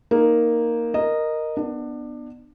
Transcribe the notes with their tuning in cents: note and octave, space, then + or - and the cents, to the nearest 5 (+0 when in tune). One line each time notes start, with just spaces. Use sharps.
A#3 +0 D#4 +0
A#4 +0 D#5 -10
B3 +0 D4 +25